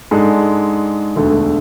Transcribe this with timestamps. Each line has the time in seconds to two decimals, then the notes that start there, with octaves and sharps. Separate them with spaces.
0.11 G#2 G#3 D4 A4
1.16 E1 D2 D3 A3